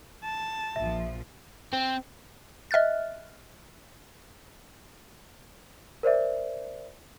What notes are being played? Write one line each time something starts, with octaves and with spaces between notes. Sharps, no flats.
A5
A#1 F3 E5
C4
D#5 E5 F6 F#6 A6
A#4 C5 D5 E5